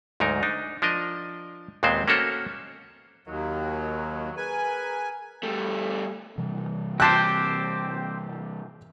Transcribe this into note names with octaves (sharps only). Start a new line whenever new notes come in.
D2 G#2 F#3 D#4 A#4
D4 D#4
F3 D4 A#4 D#5
D#2 A#2 G#3 B3 C4 C5
A#3 C#4 F#4 A4 A#4 C5
D#2 D#3 F#3
G#4 A#4 B4 G#5
G3 A3
C3 E3 G3
C4 G4 C5 A5 F#6